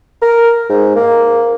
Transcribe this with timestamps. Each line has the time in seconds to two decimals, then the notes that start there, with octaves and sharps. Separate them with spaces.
0.22 A#4
0.69 G#2
0.95 A#3